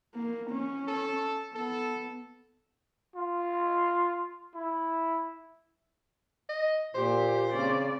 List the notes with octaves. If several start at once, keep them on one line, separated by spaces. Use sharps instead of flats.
A#3
C#4
A4
B3 A4
F4
E4
D#5
A#2 G4 C5
C#3 C4 C#4 D5